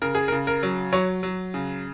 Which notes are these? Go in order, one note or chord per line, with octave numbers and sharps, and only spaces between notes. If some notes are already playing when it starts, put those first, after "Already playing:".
C#3 A#4
G#4
A#4
C#3
A#4
F#3
F#3 C#5
F#3
C#3